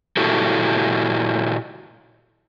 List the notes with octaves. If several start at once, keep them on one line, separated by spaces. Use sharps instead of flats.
A#2 E4 F#4 G4 A4